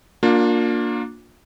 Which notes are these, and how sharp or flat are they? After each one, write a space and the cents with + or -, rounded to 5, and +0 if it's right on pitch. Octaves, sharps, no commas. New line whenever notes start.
A#3 +0 D4 +0 F4 +35